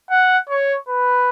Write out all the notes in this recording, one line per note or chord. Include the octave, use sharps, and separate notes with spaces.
F#5
C#5
B4